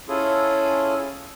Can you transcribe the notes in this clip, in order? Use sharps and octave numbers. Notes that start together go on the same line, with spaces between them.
C#4 E4 F4 G#4 A4